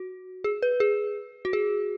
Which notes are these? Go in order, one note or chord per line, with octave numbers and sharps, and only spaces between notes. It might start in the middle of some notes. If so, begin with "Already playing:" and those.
Already playing: F#4
G#4
B4
G#4
F#4
G#4